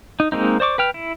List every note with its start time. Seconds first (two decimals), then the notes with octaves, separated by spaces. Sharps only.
0.20 D#4
0.32 G#3 A#3 C4 D#4
0.60 C5 D5 C#6 D6
0.78 B4 G5 F6
0.94 E4